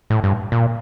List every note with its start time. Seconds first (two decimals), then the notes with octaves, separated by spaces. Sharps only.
0.10 A2
0.24 G2
0.52 A#2